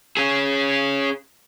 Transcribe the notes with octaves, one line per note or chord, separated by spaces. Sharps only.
C#4 G#4